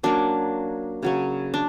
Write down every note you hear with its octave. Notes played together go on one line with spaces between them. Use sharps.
F#3 A#3 C#4 D4
C#3 F#3 C#4
D4